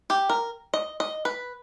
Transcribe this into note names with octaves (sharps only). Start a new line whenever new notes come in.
G4
A#4
D#5
D#5
B4